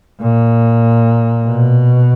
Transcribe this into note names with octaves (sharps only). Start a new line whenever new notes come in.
A#2
B2